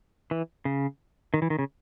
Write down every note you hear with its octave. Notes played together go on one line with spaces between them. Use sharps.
E3
C#3
D#3
E3
D#3
C#3